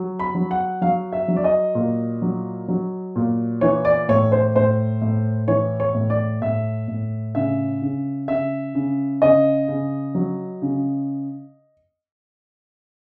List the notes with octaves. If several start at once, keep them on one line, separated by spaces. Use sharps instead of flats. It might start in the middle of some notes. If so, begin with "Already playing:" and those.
Already playing: F#3
B5
F#3
F#5
F#3 F5
E5
F#3
D5
D#5
A#2
F#3
F#3
A#2
E3 C#5
D5
A2 C#5
C5
A2 C5
A2
E3 C#5
C#5
A2
D5
A2 E5
A2
C#3 E5
C#3
C#3 E5
C#3
C#3 D#5
C#3
F#3
C#3